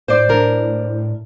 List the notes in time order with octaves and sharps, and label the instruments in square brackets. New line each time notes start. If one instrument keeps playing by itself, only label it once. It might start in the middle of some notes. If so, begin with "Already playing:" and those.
[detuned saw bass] A2 [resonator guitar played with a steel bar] C5 D5
[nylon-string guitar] D4 A#4